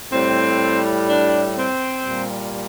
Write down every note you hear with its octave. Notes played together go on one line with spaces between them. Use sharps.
A2 G3 C4
D4
C4
A#2 G3